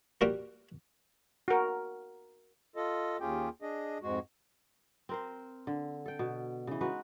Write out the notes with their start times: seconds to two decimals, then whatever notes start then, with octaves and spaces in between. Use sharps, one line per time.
0.21 G3 A#3 F#4 G4 A#4
1.48 F#4 A#4
2.76 F4 A4 D#5
3.20 D#2 C#4 F4 G4 G#4 G5
3.62 D4 G#4 D#5
4.02 F2 G#2 G#3 F#4
5.09 C4 A#4 C5
5.67 D3
6.06 A4 G5
6.19 B2
6.67 C#3 E3
6.81 G#3 D#4 F#4 B4